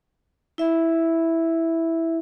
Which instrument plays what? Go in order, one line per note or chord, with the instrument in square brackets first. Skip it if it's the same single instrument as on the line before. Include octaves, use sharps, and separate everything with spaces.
[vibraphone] E4 E5